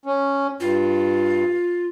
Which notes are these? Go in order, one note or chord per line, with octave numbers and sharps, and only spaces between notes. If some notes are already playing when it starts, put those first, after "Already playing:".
C#4
G2 F4